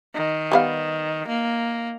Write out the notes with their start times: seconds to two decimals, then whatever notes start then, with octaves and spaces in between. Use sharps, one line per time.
0.15 D#3
0.52 G3 B3 F5
1.28 A#3